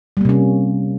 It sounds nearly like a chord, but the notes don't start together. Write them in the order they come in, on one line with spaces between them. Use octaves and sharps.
G3 A#3 C3 C#4